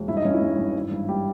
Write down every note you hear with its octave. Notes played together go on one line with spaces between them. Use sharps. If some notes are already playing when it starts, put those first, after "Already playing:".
Already playing: E1
G2 E4 E5
D#4 D#5
G2 C#4 C#5
E3 E4
G2
G2
G#1
G2
G3 G4